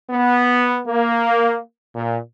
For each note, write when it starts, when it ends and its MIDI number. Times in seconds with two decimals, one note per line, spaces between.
0.11 0.80 59
0.87 1.59 58
1.96 2.18 46